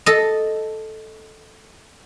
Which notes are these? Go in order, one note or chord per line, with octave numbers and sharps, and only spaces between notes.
A4 D#5